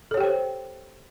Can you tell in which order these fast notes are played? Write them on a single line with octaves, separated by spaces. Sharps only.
A4 C#5 G4 G5 C5